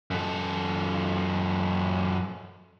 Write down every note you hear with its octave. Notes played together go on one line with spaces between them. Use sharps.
F#2 A4